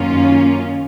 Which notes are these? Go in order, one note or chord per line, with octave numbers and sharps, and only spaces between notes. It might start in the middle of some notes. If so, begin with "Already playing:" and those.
Already playing: F#2 D#3 A#3 C#4 F4